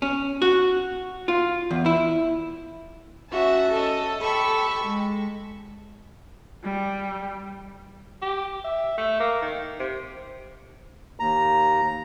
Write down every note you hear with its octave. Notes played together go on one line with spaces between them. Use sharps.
C#4
F#4
F4
E2
E4
C#4 F#4 E5 A5
A4 D#5
G4 A4 B5 C#6
G#3
G3
G4
E5
A3
A#3
D#3
C3
D#2 A#5